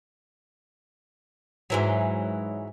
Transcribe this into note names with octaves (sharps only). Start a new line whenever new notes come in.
G#2 E3 F#3